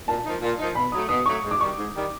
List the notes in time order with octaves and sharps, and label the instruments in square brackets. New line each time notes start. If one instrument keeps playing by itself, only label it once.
[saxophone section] A#2 [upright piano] A5
[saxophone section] F3 A#3 D#4
A#2
F3 A#3 D#4
[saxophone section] B2 [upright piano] B5
[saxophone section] F#3 A3 [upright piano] D#6
[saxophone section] B2 [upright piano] D#6
[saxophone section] F#3 A3 [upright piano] C#6
[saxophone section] G#2
[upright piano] D6
[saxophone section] D#3 G3 [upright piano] C#6
[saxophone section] G#2
D#3 G3